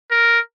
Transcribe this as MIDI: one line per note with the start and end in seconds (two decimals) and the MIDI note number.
0.11 0.40 70